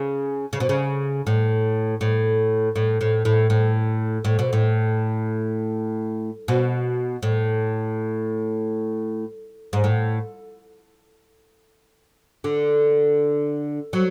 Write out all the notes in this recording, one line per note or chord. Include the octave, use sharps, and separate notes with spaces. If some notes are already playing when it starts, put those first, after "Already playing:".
Already playing: C#3
C#3
B2
C#3
A2
A2
A2
A2
A2
A2
A2
B2
A2
B2
A2
G#2
A2
D3
F#3